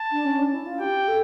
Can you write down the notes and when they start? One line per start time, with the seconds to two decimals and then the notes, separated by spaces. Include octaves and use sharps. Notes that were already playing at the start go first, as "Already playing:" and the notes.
Already playing: A5
0.12 D4
0.25 C#4
0.38 D4
0.52 E4
0.66 F4
0.80 G4 G5
1.08 A4